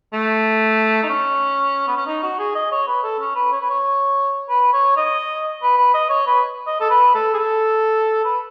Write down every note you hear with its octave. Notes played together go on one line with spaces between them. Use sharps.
A3
D#4
C#4
B3
C#4
D#4
F#4
G#4
D#5
C#5
B4
A4
C#4
B4
C#5
B4
C#5
B4
C#5
D#5
B4
B4
D#5
C#5
B4
D#5
A4
B4
A4
G#4
A4
B4